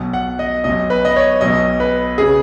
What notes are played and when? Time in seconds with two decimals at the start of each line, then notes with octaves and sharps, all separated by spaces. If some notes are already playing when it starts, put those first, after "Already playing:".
Already playing: B1 B2
0.13 F#5
0.39 D#5
0.64 B1 B2 D#5
0.90 B4
1.05 D#5
1.16 C#5
1.41 B1 B2 D#5
1.80 B4
2.18 C#3 G#4